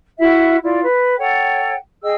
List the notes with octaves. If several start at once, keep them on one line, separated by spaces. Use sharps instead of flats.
E4 F#4 E5
E4 F4 D5
B4
A4 C#5 F#5 G5
G#4 D#5 G5 E6